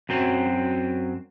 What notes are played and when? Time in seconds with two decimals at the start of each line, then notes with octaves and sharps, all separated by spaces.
0.09 F#2 F#3 C4